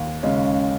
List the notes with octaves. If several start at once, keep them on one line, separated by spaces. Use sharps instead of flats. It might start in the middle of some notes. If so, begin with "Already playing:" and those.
Already playing: D#2
C#3 G#3 C#4